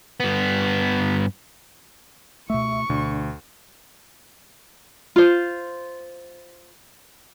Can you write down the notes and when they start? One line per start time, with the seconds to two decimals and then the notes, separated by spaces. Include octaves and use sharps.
0.20 G2 B3
2.50 C#2 B2 A3 E5 C#6
2.90 D2 B2 D4
5.16 F4 C5